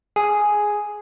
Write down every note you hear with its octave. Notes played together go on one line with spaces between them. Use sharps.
G#4